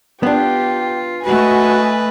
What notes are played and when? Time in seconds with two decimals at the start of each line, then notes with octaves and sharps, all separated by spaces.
0.23 B3 D4 F4 G4
1.25 A3 F#4 B4 D#5 G#5